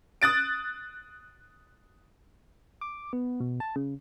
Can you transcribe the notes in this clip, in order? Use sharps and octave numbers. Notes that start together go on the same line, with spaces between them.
D#6 F#6 A6 D7
D6
B3
B2
A5
C#3